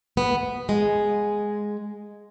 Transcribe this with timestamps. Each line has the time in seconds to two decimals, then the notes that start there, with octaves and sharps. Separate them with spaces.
0.17 B3
0.69 G#3